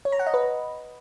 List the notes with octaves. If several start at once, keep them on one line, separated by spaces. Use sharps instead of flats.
C#5
A#5
F#5
D#5
B4